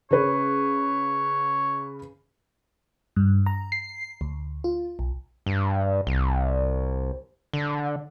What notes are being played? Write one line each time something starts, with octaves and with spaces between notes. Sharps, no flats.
C#3 C#4 B4 C#5
G2
A#5
C7
D2
F4
B1
G2
C2
D3